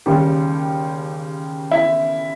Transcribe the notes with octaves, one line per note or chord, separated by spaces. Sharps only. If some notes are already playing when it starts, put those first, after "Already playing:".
D#2 C#3 G3 G4
E4